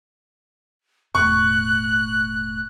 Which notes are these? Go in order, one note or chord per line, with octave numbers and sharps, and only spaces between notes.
E1 A2 C#6 F#6